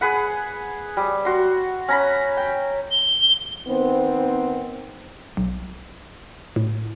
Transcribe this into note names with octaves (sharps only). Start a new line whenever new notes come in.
G#4 B4 F#5
G3
F#4 C6
C#4 A#5 B5
G5
G7
D#3 B3 C4
B1
A2